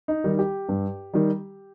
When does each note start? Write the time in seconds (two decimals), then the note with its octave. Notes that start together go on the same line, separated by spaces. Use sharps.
0.08 D#4
0.24 D#3 G3
0.39 G4
0.69 G2
1.14 D#3 G3